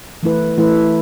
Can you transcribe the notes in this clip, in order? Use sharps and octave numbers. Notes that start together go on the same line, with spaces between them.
E3 A3 E4 B4
E3 A3 E4 B4